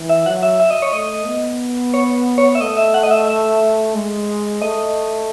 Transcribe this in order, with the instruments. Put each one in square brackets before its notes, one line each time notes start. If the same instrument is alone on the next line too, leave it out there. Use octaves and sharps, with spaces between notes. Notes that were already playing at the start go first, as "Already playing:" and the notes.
Already playing: [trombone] E3
[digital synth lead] E5
[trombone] F#3 [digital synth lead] F#5
[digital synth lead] E5
E5
D#5
C#5
[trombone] A3 [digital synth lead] D#5
[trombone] B3
[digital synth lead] C#5
C#5
E5
[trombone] A3 [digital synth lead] D#5
[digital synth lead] E5
F#5
D#5
E5
E5
[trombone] G#3
[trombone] A3 [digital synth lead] D#5